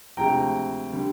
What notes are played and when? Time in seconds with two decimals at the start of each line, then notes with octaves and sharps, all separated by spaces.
0.17 D2 C3 F3 G#3 C4 G5 A#5
0.93 D3 G3